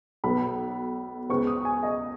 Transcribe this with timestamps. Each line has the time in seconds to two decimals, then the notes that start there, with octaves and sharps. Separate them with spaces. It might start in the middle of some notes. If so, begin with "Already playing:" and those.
0.24 B1 B2 B3 B5
1.29 C#2 C#3 B3 C#6
1.47 D#6
1.65 G#5
1.83 D#5